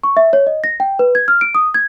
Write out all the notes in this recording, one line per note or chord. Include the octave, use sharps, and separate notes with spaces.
C#6
E5
C#5
D#5
A#6
G5
B4
G#6
F6
D7
D#6
G#6